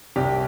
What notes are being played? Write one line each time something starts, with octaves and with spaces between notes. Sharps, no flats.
C2 G4